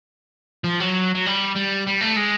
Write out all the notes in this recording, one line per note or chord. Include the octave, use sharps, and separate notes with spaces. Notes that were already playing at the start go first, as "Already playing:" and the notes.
F3
F#3
F#3
G3
G3
G3
A3
G#3